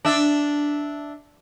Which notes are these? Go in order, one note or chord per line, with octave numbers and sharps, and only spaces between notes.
D4 E5